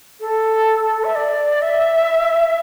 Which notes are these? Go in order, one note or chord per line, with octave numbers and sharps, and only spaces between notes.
A4
E5
D5
E5